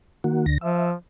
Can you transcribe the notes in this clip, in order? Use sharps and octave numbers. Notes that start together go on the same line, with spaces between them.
D#3 A#3 F#4
D2 D3 A#6
F3 E5